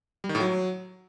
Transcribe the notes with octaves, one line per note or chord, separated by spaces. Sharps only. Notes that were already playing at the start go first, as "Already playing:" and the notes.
G3
D#3
A2
F#3